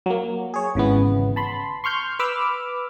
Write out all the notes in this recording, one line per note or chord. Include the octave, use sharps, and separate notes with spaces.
F#3 A#3
G#4 C#5
G#1 C#3 E3 B3
A5 B5 C6
C6 C#6 F6 G6
B4 B5 D6 E6 F6